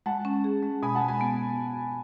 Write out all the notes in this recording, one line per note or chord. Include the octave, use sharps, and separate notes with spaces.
G#3 F#5 A5
C#4
G#4
G#3
B2 G#5 B5
F#5 A5
G#3
G#5 B5
B3